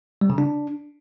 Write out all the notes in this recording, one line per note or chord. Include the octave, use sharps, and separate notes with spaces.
G3
C#3
D4